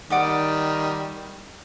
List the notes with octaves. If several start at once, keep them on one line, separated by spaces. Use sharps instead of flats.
D#3 G3 D5 F#5 D#6